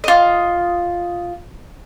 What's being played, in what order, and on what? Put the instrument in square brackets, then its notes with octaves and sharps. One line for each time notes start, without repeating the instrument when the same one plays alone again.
[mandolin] F4 D#5